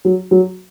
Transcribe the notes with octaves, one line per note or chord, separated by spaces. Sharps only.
F#3
F#3